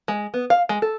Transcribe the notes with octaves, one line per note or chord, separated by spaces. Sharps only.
G#3
B3
F5
G#3
A4